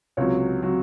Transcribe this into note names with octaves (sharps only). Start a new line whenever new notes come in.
C#2 C3 F#3 C#5
C3 F#3